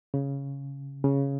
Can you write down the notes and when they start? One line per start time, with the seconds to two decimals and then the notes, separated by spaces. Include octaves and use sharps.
0.14 C#3
1.04 C#3